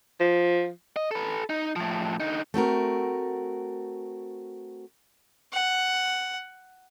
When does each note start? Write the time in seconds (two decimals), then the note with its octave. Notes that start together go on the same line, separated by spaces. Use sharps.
0.20 F3
0.96 D#5
1.11 A4 B4
1.50 D#4
1.76 A2 F3
2.20 D3 D#4
2.54 A3 C4 F#4 A#4
5.53 F#5